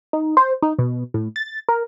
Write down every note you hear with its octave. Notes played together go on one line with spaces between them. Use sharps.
D#4
C5
D#4
B2
A2
A6
A#4